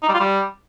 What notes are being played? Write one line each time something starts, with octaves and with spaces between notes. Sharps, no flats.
D#4
G3
F4
G3